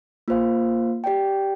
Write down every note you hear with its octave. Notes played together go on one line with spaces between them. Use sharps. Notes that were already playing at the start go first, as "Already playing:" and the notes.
A#3 F4 C5 F5
G4 D5 G5